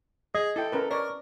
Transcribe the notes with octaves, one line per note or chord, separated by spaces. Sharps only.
G#4 D#5
E4 A4 G5
C#4 A#4 B4
A#4 C#5 D5